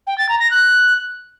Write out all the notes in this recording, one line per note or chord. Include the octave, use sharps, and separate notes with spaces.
G5
A6
A#5
A#6
F#6